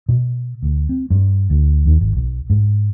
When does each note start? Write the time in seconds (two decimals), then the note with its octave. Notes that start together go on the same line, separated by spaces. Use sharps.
0.09 B2
0.63 D2
0.89 C4
1.10 G2
1.50 D2
1.86 D#2
2.01 G#1
2.17 B1
2.50 G#2